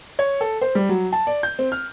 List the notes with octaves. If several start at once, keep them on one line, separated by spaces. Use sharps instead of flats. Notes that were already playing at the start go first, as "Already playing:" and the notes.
C#5
A4
C5
G3
F#3
A5
D5
G6
C4
F6